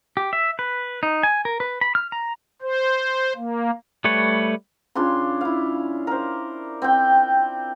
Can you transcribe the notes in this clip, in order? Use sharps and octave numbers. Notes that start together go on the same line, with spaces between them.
G4
E5
B4
D#4
G#5
A#4
B4
B5
F6
A#5
C5
A#3
G3 A3 B4 C#5
C#3 D4 F4 C6
E4 F5
A#4 C5
C4 G5